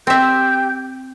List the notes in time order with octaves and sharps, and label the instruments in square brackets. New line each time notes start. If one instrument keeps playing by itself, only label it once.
[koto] C4 E5 [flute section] G4 G5 G6